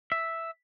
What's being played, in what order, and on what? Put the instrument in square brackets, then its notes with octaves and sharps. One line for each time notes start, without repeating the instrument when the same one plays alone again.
[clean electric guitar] E5